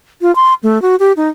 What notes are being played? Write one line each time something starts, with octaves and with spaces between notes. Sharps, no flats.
F4
C6
A3
F#4
G4
D#4